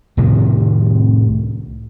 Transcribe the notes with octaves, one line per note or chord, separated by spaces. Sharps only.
C2 A2 C3 D#3